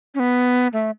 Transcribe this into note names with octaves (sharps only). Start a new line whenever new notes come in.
C#4
B3
A3